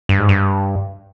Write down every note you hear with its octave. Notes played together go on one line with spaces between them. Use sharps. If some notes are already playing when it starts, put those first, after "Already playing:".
G2
G#2
G2